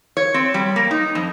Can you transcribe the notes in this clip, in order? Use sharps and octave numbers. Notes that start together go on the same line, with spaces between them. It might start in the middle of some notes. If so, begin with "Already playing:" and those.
C#5
C4
G3
A#3
D#4
F2